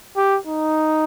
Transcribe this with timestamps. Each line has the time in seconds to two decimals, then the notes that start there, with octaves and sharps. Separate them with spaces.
0.17 G4
0.47 D#4